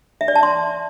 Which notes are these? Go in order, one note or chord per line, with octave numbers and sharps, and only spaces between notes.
E5
D5
A5
C6